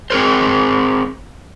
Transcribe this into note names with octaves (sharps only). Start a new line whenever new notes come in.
C4 G#4 A#4 C5